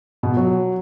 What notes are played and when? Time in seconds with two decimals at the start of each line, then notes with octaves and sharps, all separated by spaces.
0.23 B2
0.37 F#3